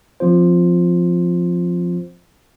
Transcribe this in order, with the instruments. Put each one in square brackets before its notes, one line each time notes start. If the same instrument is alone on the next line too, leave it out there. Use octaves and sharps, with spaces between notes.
[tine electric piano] F3 C4 F4 C5